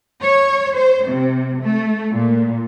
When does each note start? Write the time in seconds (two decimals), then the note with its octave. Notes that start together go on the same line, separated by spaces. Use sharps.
0.22 C#5
0.76 C5
1.08 C3
1.62 A3
2.14 A#2